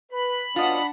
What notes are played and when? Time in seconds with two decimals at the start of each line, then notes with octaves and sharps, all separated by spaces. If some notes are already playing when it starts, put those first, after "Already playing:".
0.12 B4 B5
0.56 B2 B3 C#4 D4 F4 D#5 F#5